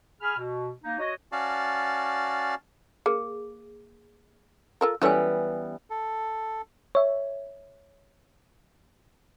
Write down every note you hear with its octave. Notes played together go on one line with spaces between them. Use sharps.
G#4 G#5 B5 F6
B2
A#3 D#4
F#4 C#5 D#5
C#4 F#4 D5 F5 A5
A#3 G#4
F4 A4 A#4
E3 F#3 G3 B3 C#4 A4 C#5 G#5
A4
C#5 E5